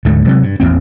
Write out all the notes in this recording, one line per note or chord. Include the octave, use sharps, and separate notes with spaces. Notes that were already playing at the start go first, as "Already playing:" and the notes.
D2 G#2 D3 A3
C3 F#3 G#3
G2
A1 E2 A#3 C4